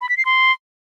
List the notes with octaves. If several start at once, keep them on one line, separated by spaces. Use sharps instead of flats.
B5
B6
C7
C6